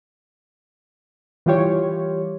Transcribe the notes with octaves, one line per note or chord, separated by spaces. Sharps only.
E3 G3 F4 G4 C#5